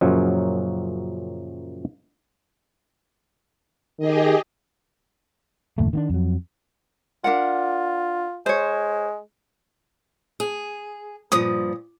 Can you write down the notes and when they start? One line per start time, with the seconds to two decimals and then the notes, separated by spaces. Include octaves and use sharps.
0.01 F#2 A#2 C#3 F3 F#3
3.99 D#3 G4 G#4 D#5
5.78 F#1 D#2 A2 A3
5.93 D#3 B3 D4
6.10 F2 F#3
7.24 D4 F4 A#4 F#5
8.46 G#3 C5 C#5
10.40 G#4
11.32 G2 A#2 F3 D#6